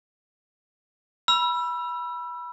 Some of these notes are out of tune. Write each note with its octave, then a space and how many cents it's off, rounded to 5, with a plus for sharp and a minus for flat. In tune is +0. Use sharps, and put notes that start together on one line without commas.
B5 -20 E6 +20